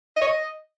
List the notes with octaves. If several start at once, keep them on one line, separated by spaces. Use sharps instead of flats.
D#5
C#5
D#5